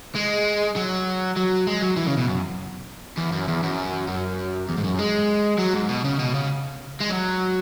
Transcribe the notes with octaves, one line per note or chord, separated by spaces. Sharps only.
G#3
F#3
F#3
G#3
F#3
E3
C#3
B2
F#2
E2
F#2
E2
F#2
F#2
E2
G#2
F#2
G#3
F#3
G#2
B2
C#3
B2
C#3
G#3
F#3